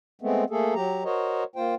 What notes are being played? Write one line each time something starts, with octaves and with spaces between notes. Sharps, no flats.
G#3 A3 B3 C4
A3 A#3 G#4 A4
F#3 G4 A#5
F#4 A#4 C5 C#5 D#5
A#3 F4 C5 G5